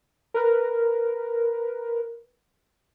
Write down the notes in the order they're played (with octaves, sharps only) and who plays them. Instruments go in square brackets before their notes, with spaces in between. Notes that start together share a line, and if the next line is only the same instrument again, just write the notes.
[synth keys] A#4 B4